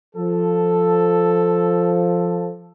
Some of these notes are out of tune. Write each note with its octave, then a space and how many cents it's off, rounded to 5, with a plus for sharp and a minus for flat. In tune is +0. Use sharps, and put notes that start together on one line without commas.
F3 +0 A4 +0